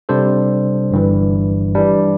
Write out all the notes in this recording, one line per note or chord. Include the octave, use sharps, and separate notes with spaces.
C3 G3 D4 A4 C5
G1 G2 E3
E3 G3 D4